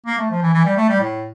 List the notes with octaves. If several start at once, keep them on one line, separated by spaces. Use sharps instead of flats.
A#3
A3
F3
E3
E3
G3
A3
G3
A2